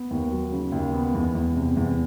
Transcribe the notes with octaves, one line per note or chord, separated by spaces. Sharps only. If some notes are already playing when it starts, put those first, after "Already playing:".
Already playing: B3
D#2
F#3
C#3
D#2
B3
E2
E2
C3
E2